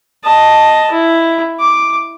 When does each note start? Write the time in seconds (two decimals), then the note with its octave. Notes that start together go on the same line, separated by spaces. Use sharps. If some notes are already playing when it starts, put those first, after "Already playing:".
0.24 D#5 A5
0.91 E4
1.60 D6